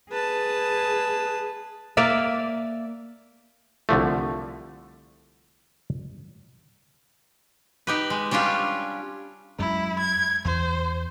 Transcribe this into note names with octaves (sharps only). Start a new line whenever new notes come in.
G#4 B4 A5
A#3 D5 E5 F5
C2 D3 F3 A3
D#4 G4 B4
G#3
G3 C#4 D4 F4 G4
F#2 G#3 E4
G#6
E2 C5